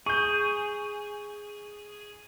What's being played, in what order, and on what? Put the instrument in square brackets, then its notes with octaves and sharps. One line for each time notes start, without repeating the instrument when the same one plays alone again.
[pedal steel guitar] G#4 [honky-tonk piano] C#6 G6